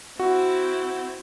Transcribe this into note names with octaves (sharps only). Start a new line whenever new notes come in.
C4 E4 F#4